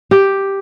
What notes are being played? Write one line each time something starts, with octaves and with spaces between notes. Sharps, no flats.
G4